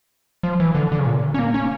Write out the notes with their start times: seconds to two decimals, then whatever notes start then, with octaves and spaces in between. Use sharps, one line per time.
0.43 F3
0.60 E3
0.75 D3
0.92 D3
0.99 C#3
1.06 A#2
1.34 C#4
1.39 A#3
1.54 C#4